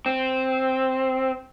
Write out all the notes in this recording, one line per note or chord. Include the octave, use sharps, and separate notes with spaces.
C4